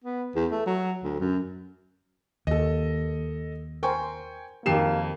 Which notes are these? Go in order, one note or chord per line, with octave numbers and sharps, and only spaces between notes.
B3
E2
A3
F#3
D2
F#2
D#2 A4 D#5
A#4 C5 G5 G#5 C#6
F2 D#3 A#3 G4 C7 E7